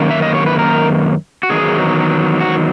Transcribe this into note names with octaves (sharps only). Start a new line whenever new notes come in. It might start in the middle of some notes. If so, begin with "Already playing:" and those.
Already playing: F#2 D#3 A#3 C#4
E5
D#5
C#5
B4
A#4
F#4
E2 D#3 F#3 D#4 G#4
F#4